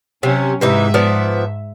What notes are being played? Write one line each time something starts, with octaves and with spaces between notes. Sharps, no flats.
C3 F#3 C#4
G#2 C3 E3 D#4 E5
F3 B3 D5